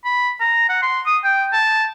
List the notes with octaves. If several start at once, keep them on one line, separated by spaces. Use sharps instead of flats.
B5
A#5
F#5
C6
D#6
G5
A5